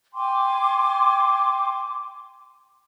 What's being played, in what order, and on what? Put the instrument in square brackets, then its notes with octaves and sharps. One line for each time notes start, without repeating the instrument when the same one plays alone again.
[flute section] G5 G#5 C6 D6